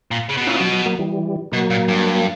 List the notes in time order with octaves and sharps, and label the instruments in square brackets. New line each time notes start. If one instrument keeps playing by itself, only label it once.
[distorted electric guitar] A#2
C#3
B2
[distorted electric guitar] A#2 [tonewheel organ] C#4 E4
[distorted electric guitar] B2 [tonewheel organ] F#3
[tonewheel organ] F#3
F#3 A#3
E3 G3
[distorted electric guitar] B2 [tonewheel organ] F#3 A#3
[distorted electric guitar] A#2
G2